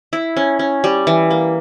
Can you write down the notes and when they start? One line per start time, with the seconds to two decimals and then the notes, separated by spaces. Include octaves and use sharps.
0.13 E4
0.37 C#4
0.59 C#4
0.84 G3
1.07 E3
1.31 A#3